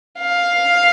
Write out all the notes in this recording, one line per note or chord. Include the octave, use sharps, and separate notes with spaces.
F5